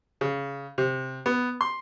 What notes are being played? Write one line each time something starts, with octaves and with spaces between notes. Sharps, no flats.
C#3
C3
B3
C6